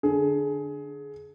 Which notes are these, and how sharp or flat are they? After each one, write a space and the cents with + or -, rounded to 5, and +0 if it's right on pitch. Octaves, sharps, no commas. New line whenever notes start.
D3 +0 G#4 +20